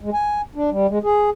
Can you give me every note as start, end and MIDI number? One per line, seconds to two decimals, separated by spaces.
0.01 0.10 56
0.14 0.41 80
0.55 0.70 62
0.70 0.87 55
0.89 0.99 56
1.03 1.30 68